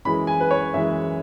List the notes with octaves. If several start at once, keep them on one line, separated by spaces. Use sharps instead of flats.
F#2 E3 G#3 B5
G#5
B4
C#5
F#2 E3 G#3 E5